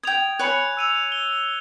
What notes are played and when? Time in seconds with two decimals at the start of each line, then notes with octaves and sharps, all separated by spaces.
0.03 G5 D#6 G#6 F7
0.39 C#5 G#5 B5 F#6 C#7
0.77 E6 D#7 F7
1.12 G7